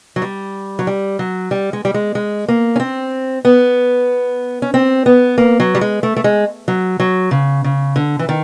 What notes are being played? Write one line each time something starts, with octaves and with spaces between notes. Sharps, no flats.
F#3
G3
F#3
G3
F#3
G3
G#3
G3
G#3
G#3
A#3
C#4
C4
B3
C#4
C4
B3
A#3
F#3
G3
G#3
A3
A3
G#3
F#3
F#3
C#3
C#3
D3
E3
D#3